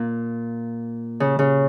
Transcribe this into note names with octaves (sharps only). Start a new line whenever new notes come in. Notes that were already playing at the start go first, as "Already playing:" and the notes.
Already playing: A#2
C#3
C#3